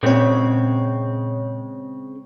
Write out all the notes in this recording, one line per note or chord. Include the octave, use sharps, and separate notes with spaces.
A#2 C#3 G#3 C4 C#5